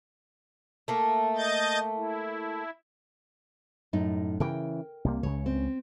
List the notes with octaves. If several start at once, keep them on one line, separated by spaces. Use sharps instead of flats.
A3 A#3
D#5 G6 A6
E4
F#2 A2 D#4
C#3 E3 A#4 G5
C2 C3 A#3
C#2 C#3 C#5
C4